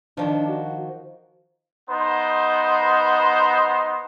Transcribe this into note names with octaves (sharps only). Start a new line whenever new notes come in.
D#3 F3 D4
F#4
B3 D#4 C5